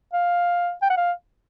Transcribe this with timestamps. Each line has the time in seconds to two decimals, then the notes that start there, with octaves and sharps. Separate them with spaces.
0.13 F5
0.82 G5
0.90 F#5
0.97 F5